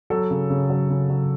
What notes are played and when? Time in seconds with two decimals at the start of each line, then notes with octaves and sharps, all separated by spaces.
0.10 F#3 A4
0.31 C#3
0.50 C#3
0.70 F#3
0.90 C#3
1.10 F#3